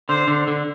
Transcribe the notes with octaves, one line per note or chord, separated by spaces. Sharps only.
D3 C5
D3
D3